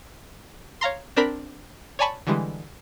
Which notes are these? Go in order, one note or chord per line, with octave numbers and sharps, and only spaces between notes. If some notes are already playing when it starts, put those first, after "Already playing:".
C#5 F5 A#5 C6
C4 D4 A#4 B5 B6
C#5 D5 G#5 A5 B5 C#6
D3 E3 G3 G#3